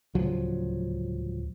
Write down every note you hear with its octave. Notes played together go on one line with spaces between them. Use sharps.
D1 C#2 F3 F#3